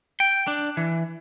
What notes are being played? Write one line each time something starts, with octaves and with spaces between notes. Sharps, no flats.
G5
D4
E3